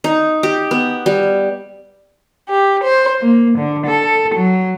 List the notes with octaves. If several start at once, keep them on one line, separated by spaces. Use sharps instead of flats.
D#4
G4
B3
G3
G4
C5
A#3
D3
A4
F#3